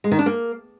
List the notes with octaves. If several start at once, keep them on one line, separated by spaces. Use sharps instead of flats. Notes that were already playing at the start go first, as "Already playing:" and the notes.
G#3
D#3
D4
A#3